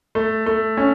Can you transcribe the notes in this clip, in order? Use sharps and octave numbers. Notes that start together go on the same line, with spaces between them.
A3
A3
C#4